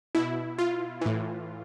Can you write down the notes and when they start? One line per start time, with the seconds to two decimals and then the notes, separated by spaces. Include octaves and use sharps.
0.15 B2 E4
0.58 F4
1.01 A2 E3